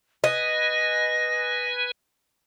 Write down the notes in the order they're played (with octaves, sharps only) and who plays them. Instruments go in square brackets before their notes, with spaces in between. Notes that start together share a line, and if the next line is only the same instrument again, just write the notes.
[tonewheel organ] B4 G#5 [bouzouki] D#5 [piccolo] A#6